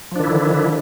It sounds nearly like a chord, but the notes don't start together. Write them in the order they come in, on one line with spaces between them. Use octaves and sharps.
F3 D4 D#3 E4 D3